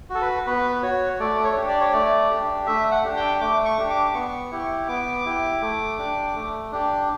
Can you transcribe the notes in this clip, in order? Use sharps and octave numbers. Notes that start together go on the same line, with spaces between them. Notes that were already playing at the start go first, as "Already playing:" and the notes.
F#4
A4
B4
B3 B4
F#4 C#5
A3 D5
C#5
D4 G4
D5
C#5
A3 D5
D4 G4
A3 E5
F#5
D4 G4
G5
A3 D6
C#6
D4 G4
D6
B3 C#6
E4 G4
B3 D6
E4 G4
A3
D4 G4
A3
D4 G4